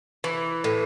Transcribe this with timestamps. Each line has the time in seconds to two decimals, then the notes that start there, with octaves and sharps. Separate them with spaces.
0.24 E3
0.64 A2